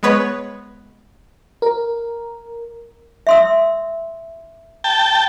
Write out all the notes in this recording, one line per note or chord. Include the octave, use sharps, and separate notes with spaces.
G#3 B3 B4 C#5
A#4
E5 C6 E6
G5 A5